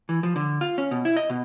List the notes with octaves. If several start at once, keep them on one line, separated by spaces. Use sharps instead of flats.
E3
F3
D3
F4
C#4
B2
E4
D#5
B2